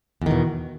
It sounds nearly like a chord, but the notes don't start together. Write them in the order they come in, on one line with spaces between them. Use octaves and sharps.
E2 D#3 B2